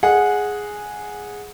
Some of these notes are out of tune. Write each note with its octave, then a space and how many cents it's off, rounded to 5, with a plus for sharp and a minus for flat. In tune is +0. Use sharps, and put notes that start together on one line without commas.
G#4 +0 D#5 -5 F#5 -15